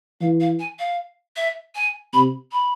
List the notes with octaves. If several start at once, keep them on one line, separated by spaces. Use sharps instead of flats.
E3 F5
F5
G#5
F5
E5
G#5
C3 B5
B5